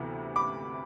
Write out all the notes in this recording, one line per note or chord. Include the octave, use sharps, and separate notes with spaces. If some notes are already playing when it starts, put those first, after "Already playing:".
Already playing: D2 C3 E3 B3
B5 D6